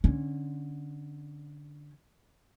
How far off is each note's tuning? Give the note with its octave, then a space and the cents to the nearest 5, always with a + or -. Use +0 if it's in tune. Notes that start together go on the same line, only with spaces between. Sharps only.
D3 +0 C#4 -20